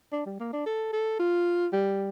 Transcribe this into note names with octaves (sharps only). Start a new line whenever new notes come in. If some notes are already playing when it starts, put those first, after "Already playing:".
D4
G3
A#3
D4
A4
A4
F4
G3